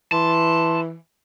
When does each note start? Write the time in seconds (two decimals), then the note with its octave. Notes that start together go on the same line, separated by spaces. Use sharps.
0.12 E3 A5 C6